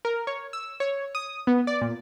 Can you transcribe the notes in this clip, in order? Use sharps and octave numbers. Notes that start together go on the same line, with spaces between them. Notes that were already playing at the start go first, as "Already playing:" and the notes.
A#4
C#5
E6
C#5
D#6
B3
D5
A#2